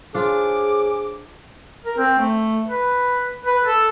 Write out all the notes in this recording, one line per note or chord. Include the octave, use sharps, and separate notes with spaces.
D4 F4 G#4 C5 C#5 D6
A#4
C4
A3
B4
B4
A4